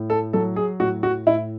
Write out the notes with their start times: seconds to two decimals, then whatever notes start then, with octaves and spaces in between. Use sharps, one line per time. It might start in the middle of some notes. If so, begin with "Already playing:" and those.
Already playing: A2
0.10 A4
0.33 F#3 A4
0.56 G#4
0.80 A2 F#4
1.03 F#4
1.26 A2 E4